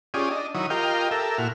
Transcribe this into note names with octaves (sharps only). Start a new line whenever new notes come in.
C#4 F4 G4 G#4 D5 D#6
D4 D#5
D#3 F#3 E4 C#5 D#6
F4 G4 A#4 D#5 F5 G5
G4 A4 A#4 E5
A#2 E4 F#4 F6